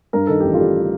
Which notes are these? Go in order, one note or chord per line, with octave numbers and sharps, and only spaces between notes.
G2 A#4
D#3 A4
A1 G4
F4 A4
G3